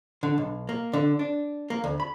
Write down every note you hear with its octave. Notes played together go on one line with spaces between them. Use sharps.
D3
B1
A#3
D3
D4
A#3
D2
B5